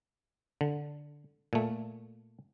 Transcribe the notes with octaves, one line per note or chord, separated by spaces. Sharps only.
D3
A#2 A3